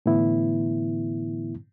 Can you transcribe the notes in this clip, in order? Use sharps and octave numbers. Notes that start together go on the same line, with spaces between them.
A2 D3 E3 B3 E4